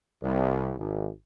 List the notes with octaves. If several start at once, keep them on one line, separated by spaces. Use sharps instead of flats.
C2
G#1